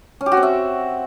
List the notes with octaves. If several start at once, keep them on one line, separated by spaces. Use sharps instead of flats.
C#4
G4
F#4
C4
E5